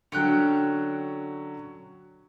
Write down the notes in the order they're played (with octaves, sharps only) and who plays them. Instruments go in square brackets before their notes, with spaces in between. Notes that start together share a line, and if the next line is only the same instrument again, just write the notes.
[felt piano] D3 F#3 [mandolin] C#4 G5 F#6